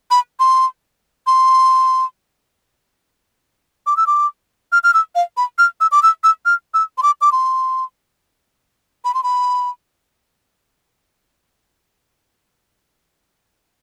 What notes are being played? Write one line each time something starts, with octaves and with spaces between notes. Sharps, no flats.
B5
C6
C6
D6
E6
D6
F6
F6
E6
F5
B5
F6
E6
D6
E6
E6
F6
E6
C6
D6
D6
C6
B5
C6
B5